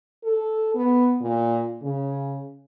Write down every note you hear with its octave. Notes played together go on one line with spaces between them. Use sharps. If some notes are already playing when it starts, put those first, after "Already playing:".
A4
B3
A#2
C#3